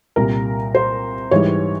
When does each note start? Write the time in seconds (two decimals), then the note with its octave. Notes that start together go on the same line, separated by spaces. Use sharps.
0.16 C2 A#2 G3 A#4
0.75 C5
1.31 G#2 E3 G3 C#5